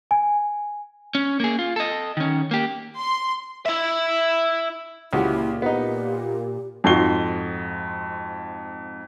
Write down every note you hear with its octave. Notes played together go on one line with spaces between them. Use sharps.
G#5
C#4
A#3 G#4
F4
A4 D#5
D#3 C#4
A#3 G4
C6
E4 E5
C#2 A#2 E4 F#4 G4
B3 D#4 G4
F2 G#2 F4 F#4 C7 G7